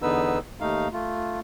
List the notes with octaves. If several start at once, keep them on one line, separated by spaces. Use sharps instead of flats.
E2 D3 B3 D#4 B4 E6
D#2 A3 D#4 F5
A3 F4